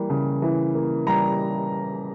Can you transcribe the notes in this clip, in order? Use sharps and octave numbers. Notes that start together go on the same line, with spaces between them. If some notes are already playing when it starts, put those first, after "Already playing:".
Already playing: E3 G3 A#3
C#3
E3
A#3
G3 A#5